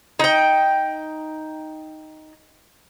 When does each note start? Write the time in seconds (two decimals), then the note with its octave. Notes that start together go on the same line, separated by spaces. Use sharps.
0.19 D#4 G5